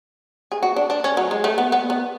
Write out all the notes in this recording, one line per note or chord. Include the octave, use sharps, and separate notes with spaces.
G#4
F#4
D4
D4
C#4
F#3
G#3
A3
B3
B3
B3